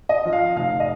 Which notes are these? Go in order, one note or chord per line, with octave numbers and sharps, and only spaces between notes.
D#5
F3
F5
F1 F5
D#5